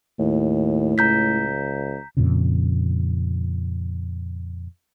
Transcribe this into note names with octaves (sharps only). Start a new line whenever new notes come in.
D#2 A2
C#2 A#5 G6 B6
F2 A#2 C#3